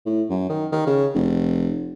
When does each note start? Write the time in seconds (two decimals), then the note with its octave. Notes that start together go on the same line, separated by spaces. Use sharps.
0.06 A2
0.29 F#2
0.49 D#3
0.72 D#3
0.87 C#3
1.14 F1